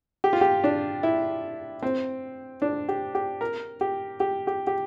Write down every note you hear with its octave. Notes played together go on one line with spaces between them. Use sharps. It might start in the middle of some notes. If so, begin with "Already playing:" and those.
G4
F4
G4
D4
E4
C4
D4
G4
G4
A#4
G4
G4
G4
G4